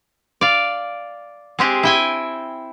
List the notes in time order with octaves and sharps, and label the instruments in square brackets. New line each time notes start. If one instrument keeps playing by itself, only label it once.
[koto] D5 F5
G#3 C4 G4 G#4
E4 G5 G#5